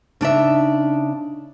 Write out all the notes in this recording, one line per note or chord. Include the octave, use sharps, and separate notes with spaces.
C#3 D4 D#4 E5